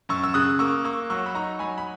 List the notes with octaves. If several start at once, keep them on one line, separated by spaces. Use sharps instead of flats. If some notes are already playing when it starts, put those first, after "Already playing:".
F#2 C#6 E6
E6
C#3 D#6 F#6
A#3 C#6 E6
A#3 C#6 E6
F#3 C#6 E6
B5
D#4 A#5 C#6
F#3 G#5 B5
B5